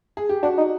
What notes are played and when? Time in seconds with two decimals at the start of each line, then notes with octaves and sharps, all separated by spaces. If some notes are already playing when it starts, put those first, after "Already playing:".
0.17 G#4
0.29 G4
0.43 D4 F#4
0.58 D#4